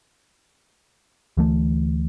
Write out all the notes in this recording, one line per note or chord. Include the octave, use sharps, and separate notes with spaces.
D2 E3 A3